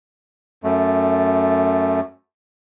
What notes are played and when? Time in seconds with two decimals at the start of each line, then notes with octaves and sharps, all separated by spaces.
0.64 F#2 A3